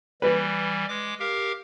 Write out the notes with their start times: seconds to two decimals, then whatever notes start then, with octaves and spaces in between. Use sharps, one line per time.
0.22 E3 G3 B4
0.88 G#3 D6
1.19 G4 A#4 F5